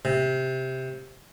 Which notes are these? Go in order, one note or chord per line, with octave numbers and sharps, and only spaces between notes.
C3